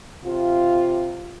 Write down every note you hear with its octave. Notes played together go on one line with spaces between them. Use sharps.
C3 F4